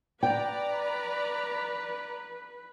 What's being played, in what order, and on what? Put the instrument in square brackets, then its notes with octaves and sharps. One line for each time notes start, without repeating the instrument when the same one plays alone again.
[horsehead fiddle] B4 [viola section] D5 A#5 [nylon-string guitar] G5